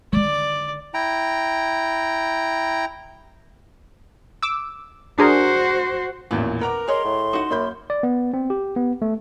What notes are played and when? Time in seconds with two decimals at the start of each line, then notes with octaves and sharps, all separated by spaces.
0.13 D3 D#3 D5
0.94 E4 G5 A#5
4.43 D6 E6
5.19 D4 F#4 G#4 A#4 C5
6.31 A1 E2 A#2 E3 A#3 F#4
6.61 A#4 B4 F#5 A#5 D6
6.88 G#4 C#5 D#5 C6
7.05 A2
7.33 D#4 F#4 F#5
7.50 F#2 A#3 B5 G6
7.90 D5
8.03 B3
8.34 C4
8.50 G4
8.76 B3
9.02 A3